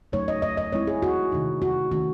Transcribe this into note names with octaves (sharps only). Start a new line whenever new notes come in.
C#3 F#3 A3 D#4 C#5
D#5
D#5
D#5
E3 G#3 C4 E4 C#5
G#4
F#4
C3 D#3 A3 D#4
F#4
D#3 A3 C#4 F#4